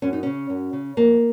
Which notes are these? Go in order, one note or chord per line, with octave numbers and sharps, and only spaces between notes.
F#2 C#4
D#4
C#3 C#4
F#2
C#3
F2 A#3